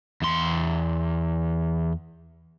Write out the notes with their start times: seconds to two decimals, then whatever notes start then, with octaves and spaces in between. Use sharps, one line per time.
0.22 E2 C6